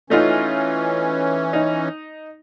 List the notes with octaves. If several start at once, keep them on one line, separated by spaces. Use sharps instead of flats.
E3 A3 C#4 D#4 F4
D#4